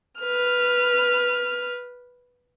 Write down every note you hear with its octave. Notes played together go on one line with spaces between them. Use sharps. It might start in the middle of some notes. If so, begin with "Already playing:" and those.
B4 F6